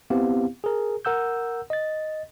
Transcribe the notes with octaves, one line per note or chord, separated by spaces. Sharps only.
B3 C4 E4 G4 F5
G#4 A#4
A#4 F#5 E6 G6
D#5 A6